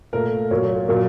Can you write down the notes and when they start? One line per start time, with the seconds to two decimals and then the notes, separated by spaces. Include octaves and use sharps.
0.13 A#2 A3 A#4
0.51 A#2 F#3 A#3 C#5
0.88 A#2 F#3 A#3